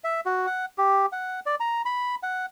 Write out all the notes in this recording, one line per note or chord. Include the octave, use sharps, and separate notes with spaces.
E5
F#4
F#5
G4
F#5
D5
A#5
B5
F#5